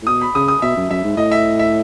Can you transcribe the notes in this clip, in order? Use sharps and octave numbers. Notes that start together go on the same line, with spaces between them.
A2
B2 D#6
B5
C#3 D#6
D#6
B2 E5
F#2
F#2 E5
G#2
A2 D#5
E5
E5